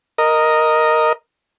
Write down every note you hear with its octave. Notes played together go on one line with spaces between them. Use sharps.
A#4 D#5